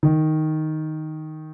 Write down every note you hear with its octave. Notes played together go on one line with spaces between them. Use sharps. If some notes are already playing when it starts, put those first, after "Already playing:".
D#3